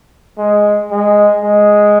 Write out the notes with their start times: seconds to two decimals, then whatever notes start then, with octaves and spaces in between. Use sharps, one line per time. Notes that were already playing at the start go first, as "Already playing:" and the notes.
0.38 G#3
0.91 G#3
1.44 G#3